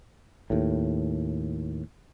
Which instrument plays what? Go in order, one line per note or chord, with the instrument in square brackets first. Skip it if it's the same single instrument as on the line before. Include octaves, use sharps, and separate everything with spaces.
[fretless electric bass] D#2 A2